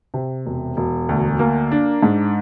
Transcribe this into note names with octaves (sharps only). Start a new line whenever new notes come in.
C3
E1
E1
D2
A#3
D4
G#2